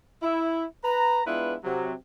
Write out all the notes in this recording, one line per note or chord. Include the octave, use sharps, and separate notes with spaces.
E4
B4 A#5
G#3 B3 D4 E4 F4 B4
C3 F#3